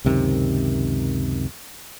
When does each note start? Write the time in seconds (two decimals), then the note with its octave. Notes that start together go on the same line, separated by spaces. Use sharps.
0.05 C#2 F#2 C3 D#3